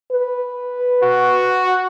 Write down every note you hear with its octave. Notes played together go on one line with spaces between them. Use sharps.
B4
F#4